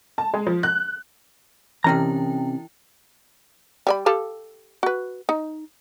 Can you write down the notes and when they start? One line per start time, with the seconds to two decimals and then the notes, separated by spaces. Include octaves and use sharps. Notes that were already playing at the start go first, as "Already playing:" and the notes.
0.18 A5
0.34 G#3
0.47 F3
0.63 F#6
1.84 C3 E3 C#4 E4 G5 A#5
3.87 G3 D5 B5
4.06 G4 A4 F5
4.83 F#4 B4
5.29 D#4